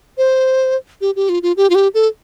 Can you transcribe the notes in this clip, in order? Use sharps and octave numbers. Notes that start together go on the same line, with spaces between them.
C5
G4
G4
F4
F4
G4
F4
G4
A4